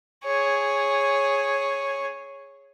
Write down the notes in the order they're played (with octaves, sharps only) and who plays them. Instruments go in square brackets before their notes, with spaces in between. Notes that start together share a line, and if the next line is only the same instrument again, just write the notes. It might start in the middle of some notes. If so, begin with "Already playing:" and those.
[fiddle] G#4 C#5